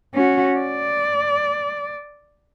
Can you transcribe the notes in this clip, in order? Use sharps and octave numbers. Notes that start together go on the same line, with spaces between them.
C#4 F#4
D5